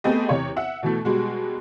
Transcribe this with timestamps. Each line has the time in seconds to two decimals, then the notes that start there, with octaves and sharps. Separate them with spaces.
0.04 A3 B3 C4 G4 G#4 D#5
0.29 E2 C3 C#5
0.56 E5 F#5
0.83 B2 E3 A3
1.05 B2 G3 G#3 F#4